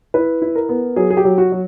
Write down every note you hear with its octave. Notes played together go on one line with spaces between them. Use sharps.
E4 B4
E4
A#4
B3
F#3 G#4
G#4
G4
F#3
F#4
F#3